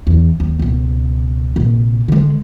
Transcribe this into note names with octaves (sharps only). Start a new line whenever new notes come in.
E2
D#2
C#2 B2
A#1 C3
D3 G#3